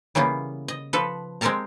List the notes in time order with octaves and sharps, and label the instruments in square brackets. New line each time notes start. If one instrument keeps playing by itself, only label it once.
[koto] C#3 E3 G3 A#3 B3
D#5
F3 A4 B4
G#3 C4 G4 A#4 A5 A#5